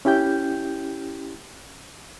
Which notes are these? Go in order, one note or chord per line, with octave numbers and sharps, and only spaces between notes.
C#4 E4 G4 G5 G6